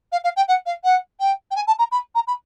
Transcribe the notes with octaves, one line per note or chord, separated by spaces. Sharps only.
F5
F5
G5
F#5
F5
F#5
G5
G5
G#5
A5
A#5
B5
A#5
B5